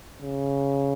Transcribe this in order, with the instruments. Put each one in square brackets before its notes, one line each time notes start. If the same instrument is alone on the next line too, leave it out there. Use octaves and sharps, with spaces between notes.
[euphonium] C#3